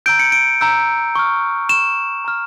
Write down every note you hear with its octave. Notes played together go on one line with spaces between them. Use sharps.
A#5 E6 G6 D7
C#7
D7
A#5 E6 G6
C#6 F6
C#6 F6 E7
A#5 C#6 F6